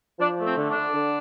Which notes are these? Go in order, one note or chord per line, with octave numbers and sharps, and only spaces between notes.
F3 D4
A3
C4
D3
D4
D3
D3